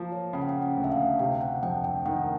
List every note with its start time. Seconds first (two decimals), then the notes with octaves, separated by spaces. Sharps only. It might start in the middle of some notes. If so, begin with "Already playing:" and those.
Already playing: F3 A#3
0.12 C#5
0.33 C#3 G5
0.42 F#5
0.49 G5
0.62 F#5
0.77 D2
0.84 E5
0.92 F5
1.19 C3 G5
1.41 F#5
1.63 F2 G5
1.84 G5
2.06 D#3 F#5